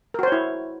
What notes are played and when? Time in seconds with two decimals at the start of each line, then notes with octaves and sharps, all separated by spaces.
0.14 A#4
0.19 F#4
0.23 C5
0.28 C#5
0.32 E4